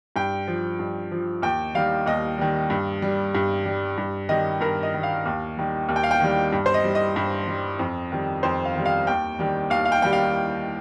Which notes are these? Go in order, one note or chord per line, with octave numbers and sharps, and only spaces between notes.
G2 G5
F3
G2
F3
D#2 G5
D#3 G3 F5
D#2 D#5
D#3 G3
G2
G3
G2
G3
G2
D#3 G3 D#5
G2 A#4
D#5
D#3 G3
F5
D#2
D#3 G3
D#2
G5
F5
G5
D#3 G3
G2
C5
D#5
G3
D#5
G2
G3
F2
D#3 G3
F2 C5
F5
D#3 G3
F5
D#2 G5
D#3 G3
D#2 F5
F5
G5
D#3 G3 G5
F5